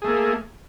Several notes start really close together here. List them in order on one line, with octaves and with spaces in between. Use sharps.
G#4 A3 A#3